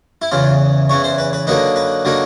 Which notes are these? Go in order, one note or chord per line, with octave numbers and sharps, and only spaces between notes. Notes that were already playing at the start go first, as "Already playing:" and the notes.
E4
E2 C#3 E3 F4
E2 C#3 E3 C#5
C5
B4
B4
D3 F#3 A#3 D#4 B4
B4
D3 F#3 A#3 D#4